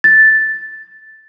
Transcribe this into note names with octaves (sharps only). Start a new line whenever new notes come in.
A6